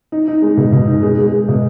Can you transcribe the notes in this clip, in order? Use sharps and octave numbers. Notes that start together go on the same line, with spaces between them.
D#4
D#4
G#3
B2
B2
D#4
G#3
G#3
G#3
B2